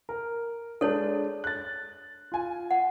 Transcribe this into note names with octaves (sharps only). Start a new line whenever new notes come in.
A#4
G#3 D4 A4 C#5 A5
F#6 A6
F4 G#5
F#5